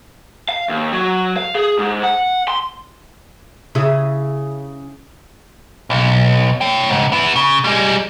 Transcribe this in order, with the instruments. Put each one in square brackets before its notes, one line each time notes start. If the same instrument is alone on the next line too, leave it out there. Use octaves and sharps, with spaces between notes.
[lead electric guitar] F5
D#2
F#3
F5
G#4
G#2
F#5
C6
[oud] C#3 E4 G#4
[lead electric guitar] B1
C#5 G5
C#2 G#2
B3 E4
C#3
G3 G#3